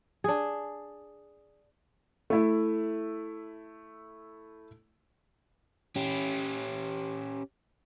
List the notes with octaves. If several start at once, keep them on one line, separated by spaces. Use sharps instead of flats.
D4 G#4
A3 E4
C#4 G4